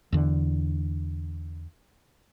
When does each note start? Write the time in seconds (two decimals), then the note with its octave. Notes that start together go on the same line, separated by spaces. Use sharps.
0.13 E2 D3